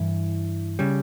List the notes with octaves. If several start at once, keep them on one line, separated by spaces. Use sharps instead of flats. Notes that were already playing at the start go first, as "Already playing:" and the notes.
Already playing: G2 E3 E4
C#3 G3